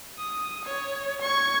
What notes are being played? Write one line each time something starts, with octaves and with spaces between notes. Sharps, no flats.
D#6
C#5
C#6 G#6